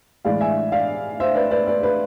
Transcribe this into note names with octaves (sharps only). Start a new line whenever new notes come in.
A2 E3 G#3 D5 F5
E5 G#5
D5 F5
C5 E5
B4 D5
B4 D5
B4 D5
B4